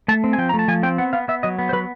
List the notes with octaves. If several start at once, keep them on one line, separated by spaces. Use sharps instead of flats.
A3 A5
C4
G#5
F3 G5
A#5
A3
A5
F3 G#5
C4 G5
B3 F#5
B3 F5
B3 E5
F#3 D#5
B3
C5
F#3 B4